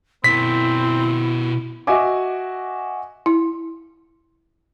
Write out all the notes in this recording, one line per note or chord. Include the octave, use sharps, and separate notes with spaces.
B2 C4 E4 A#4 B6
F#4 D#5 E5 G#5 D6
E4